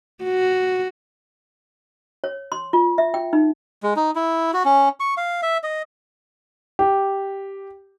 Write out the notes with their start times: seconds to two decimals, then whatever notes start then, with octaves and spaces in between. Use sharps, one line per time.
0.24 F#4
2.24 C#5
2.52 C6
2.73 F4
2.98 E5
3.14 G5
3.33 D#4
3.83 G#3
3.96 D#4
4.15 E4
4.53 F#4
4.65 C#4
5.00 C#6
5.17 F5
5.43 E5
5.63 D#5
6.79 G4